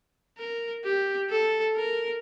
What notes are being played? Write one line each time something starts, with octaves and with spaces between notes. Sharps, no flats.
A#4
G4
A4
A#4